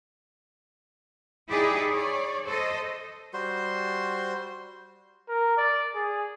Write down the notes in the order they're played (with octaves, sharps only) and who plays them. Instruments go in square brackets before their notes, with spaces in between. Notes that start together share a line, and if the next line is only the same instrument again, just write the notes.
[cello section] D#4 E4 G4 G#4 D5
C#5 D5
A4 C5 D#5
[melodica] G3 F#4 C5 C6
[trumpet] A#4
D5
G#4